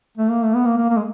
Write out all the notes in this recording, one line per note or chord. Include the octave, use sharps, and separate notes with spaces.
A3
A#3
A3
B3
A#3
A#3
A#3
G#3